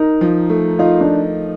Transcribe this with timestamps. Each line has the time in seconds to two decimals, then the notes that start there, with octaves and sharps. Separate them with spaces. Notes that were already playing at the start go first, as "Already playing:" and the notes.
Already playing: D#4 A#4
0.21 F3
0.49 A3
0.79 D#4 F4
1.01 D4